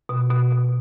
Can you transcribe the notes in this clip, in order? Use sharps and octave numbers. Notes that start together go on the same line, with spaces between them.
B2
B2
B2